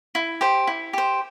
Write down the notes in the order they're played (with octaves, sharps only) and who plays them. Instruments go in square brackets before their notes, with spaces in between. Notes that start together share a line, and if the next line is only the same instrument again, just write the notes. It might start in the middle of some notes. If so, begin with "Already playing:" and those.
[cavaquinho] E4
G4 C5
E4
G4 C5